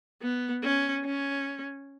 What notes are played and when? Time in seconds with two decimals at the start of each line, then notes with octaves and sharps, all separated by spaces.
0.22 B3
0.63 C#4
1.04 C#4